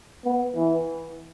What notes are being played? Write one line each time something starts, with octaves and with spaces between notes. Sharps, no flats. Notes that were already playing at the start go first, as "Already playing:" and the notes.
B3
E3